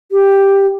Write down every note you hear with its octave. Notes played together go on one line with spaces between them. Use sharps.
G4